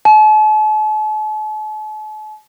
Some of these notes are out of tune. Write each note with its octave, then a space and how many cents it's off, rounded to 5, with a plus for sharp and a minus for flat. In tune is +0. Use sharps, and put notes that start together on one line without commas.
A5 -45